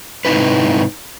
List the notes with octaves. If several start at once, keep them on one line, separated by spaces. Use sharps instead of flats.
G#2 C3 D#4 E4 B4